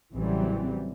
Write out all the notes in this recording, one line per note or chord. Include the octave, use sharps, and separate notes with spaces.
A1 C#3 E3 F#3 G3 C4